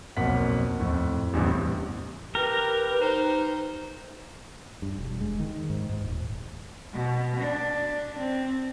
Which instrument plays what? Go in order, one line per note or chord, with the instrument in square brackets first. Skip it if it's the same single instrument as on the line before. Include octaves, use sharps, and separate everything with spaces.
[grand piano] B1 F2 A#3 F#5 B6
F2 A2
A1 E2 G2 C3
[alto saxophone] G4 [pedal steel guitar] A#4 [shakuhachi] B4
[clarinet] D#4 [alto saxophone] C5
[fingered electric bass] G2
E1
G#3
D#3
G#2
G#2
D#1
[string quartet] B2
D4
C4